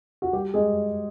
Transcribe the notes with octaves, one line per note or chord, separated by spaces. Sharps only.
F#4
G3 G4
G#3 G#4